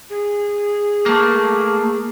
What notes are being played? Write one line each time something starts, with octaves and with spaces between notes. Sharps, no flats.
G#4
A3 A#3